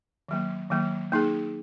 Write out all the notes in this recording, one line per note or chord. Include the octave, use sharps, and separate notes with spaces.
D#3 F#3 A#3
D#3 F#3 A#3
A#3 D#4 G#4